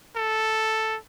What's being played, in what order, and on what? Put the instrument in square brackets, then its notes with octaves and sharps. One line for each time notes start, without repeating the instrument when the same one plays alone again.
[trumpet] A4